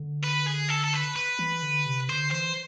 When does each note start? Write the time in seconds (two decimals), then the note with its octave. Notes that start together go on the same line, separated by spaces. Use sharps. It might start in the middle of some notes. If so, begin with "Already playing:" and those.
Already playing: D3
0.24 B4
0.47 G#4
0.69 A4
0.84 A4
0.94 B4
1.16 B4
1.39 E3
1.63 D3
1.86 C3
2.09 D3 C5
2.31 E3 C5